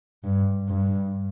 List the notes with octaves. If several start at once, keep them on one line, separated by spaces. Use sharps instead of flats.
G2
G2